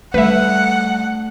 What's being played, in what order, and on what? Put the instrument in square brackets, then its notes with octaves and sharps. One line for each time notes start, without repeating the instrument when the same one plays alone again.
[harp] D3 A3 [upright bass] G3 [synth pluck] B4 E5 [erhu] F#5